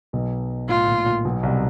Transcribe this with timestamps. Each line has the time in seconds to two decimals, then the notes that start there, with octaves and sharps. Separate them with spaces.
0.13 B1 B2
0.69 A2 F4
0.87 A#2
1.06 A#2
1.25 B1 B2
1.43 C2 C3